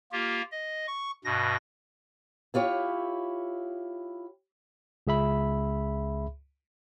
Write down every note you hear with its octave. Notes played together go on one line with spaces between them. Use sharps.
A#3 F4 G4
D#5
C#6
G2 B2 A#6
E4 F4 G4 C#5
C#2 G#4 E5 B5